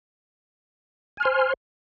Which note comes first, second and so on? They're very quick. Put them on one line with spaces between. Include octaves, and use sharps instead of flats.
G#5 F6 C6 C5